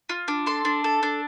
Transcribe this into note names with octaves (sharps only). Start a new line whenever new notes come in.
F4
D4
A4 C6
D4
A4
D4